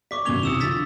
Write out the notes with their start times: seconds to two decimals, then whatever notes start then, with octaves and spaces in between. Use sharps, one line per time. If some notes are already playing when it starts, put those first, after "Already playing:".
0.11 D5 C#6 D6 B6
0.25 E1 F#2 D6 G#6 F7 G7
0.43 C2 D#6 E6 C#7 E7
0.60 D3 F3 E6 A6 B6